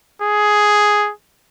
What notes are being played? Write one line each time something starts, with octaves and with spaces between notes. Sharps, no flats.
G#4